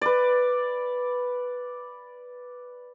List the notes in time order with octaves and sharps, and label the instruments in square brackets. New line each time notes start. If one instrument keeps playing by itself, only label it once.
[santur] B4 D5